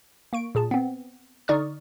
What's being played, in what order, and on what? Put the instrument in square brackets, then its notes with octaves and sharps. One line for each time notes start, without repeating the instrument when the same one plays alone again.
[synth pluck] A#3 C#6 D7
A#2 G#4 A5
B3 C4
D3 D#4 D5 C#6 D#6 F6